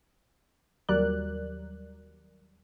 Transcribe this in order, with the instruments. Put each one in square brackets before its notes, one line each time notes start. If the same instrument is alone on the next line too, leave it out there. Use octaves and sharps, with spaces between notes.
[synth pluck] D#2 F#3 G3 A#4 D5 F#6